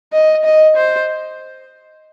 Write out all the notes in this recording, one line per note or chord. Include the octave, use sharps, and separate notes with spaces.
D#5
D#5
C5